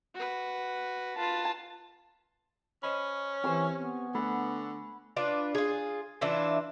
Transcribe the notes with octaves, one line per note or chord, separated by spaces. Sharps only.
F#4 B4
F4 B4 A5
C#4 C5 D#5 B5
E3 C4 G4 C5 G#5 C#6
B3
D3 A3 F#5 B5
D4 F4 B4
F4 G#4
E3 D4 E4 F4